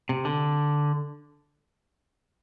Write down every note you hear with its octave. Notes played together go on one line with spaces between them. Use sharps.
C3
D3